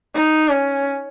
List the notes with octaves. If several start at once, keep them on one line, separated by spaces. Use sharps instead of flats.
D#4
C#4